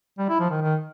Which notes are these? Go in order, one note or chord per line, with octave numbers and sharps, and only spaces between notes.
G3
E4
F3
D#3
D#3